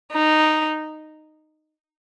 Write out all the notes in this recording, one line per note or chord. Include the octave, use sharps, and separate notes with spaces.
D#4